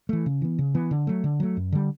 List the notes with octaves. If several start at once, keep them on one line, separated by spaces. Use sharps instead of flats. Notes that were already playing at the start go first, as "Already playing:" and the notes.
E3 A3
C#3
E3 B3
C#3
E3 B3
D3
F#3 A3
D3
F#3 A3
F#2
D3 G3